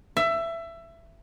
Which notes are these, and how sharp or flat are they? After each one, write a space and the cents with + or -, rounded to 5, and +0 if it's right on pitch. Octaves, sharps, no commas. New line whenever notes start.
E5 +20